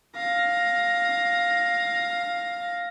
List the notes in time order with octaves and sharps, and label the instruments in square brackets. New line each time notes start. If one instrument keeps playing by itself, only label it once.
[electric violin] F5 A#6